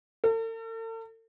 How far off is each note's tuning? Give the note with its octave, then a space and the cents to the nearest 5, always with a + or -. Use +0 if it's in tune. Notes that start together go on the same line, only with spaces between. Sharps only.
A4 +45